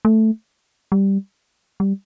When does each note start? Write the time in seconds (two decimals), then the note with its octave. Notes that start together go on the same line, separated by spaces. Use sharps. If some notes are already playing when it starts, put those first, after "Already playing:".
0.05 A3
0.92 G3
1.80 G3